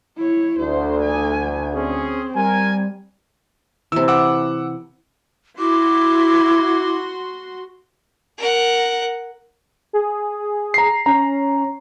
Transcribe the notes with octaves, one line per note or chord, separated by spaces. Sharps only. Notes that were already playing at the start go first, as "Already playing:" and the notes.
E4 C#5
D2 C5
G#5
C4 C#4 G#4
G3 A#4 G#5
C3 E3 E6
F#5 D6 E6
E4 F#4 C6 D6
A#4 F#5
G#4
A#5 C7
C#4 A#5